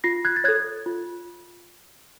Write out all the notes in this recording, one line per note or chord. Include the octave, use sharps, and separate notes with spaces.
F4 A#6 C7
F#6 G#6
A6
A4 C#5 F#6 G#6
F4